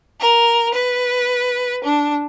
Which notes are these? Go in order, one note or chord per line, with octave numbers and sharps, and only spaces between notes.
A#4
B4
D4